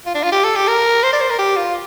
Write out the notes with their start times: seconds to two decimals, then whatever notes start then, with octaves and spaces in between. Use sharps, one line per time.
0.06 F4
0.14 D4
0.23 F4
0.32 G4
0.44 A4
0.56 G4
0.68 A#4
1.03 C5
1.12 D5
1.21 C5
1.30 A#4
1.39 G4
1.56 F4